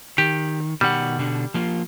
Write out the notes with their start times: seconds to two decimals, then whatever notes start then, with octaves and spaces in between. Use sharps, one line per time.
0.18 D#3 G4
0.81 B2 D#3 G3 F#5
1.18 B2 D3 D4
1.54 F3 A#3 F4